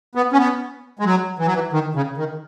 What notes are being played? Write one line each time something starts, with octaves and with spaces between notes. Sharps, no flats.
B3
C#4
B3
G#3
F#3
E3
F#3
E3
D#3
C#3
D#3